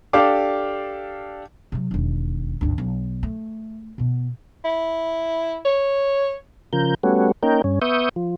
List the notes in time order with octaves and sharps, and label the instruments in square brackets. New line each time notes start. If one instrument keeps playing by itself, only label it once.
[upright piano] D4 G4 A4 F5 D6
[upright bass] C3 F#3
E1 D#2
G#1 D2
B1
A3
B2 B3
[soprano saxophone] E4
C#5
[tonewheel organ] C#3 F3 A#4 G6
G3 A3 B3 C#4 F#4
A#3 C#4 D#4 A#4 G5
G2 C#4
B3 E5 C#6 D#6 G6
F3